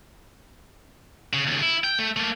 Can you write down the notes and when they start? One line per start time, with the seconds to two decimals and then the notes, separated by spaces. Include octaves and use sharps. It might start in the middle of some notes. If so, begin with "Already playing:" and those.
1.33 C#3
1.47 D#2 C#3
1.62 E4
1.84 G5
1.99 A3
2.17 A3 A#3